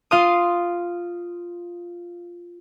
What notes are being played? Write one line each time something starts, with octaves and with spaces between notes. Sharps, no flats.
F4 F5 C6 D#6